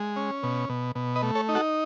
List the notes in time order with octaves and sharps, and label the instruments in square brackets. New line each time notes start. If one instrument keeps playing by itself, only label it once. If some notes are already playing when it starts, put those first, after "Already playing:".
Already playing: [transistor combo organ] G#3
C#4
B2
B2
B2
B4 D#5
A3
A4 C#5
D#4
F#4 A4